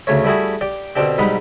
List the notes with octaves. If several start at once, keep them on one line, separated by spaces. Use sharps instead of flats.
D2 C#3 A3 C#5
G3 A3 E4 F#4 G#4
G4 D5
B2 D3 C4 D4 G4
B1 G#2 G3 D#4 F#5 B5